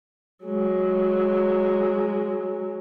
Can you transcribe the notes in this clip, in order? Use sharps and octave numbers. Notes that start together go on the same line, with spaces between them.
F#3 G#3